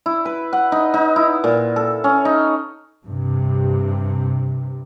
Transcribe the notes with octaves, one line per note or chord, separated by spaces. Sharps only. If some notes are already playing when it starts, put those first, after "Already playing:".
E4
B4
F#5
D#4
D#4
E4
A#2
A4
C#4
D#4
G2 C3